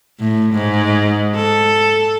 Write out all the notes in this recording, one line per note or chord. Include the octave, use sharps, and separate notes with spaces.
A2
G#2
A4